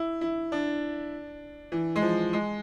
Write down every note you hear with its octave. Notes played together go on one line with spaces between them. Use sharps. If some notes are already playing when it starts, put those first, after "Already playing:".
Already playing: E4
E4
D4
E3
G#3
F3
G#3